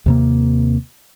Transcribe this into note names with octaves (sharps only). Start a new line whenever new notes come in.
D#2 C3 A#3